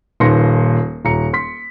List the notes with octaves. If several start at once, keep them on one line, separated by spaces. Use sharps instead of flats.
D#1 D#2 B4 C6 A#6 C#7
D#1 A#5 C#7
C6 B6